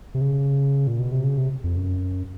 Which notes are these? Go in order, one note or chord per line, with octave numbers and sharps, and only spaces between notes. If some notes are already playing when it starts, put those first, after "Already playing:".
C3
C#3
A#2
B2
C3
C#3
C3
F2
F#2